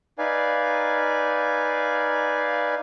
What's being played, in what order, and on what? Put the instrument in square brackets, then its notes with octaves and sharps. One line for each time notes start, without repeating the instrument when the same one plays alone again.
[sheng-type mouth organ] D#4 B4 D5 F5 G#5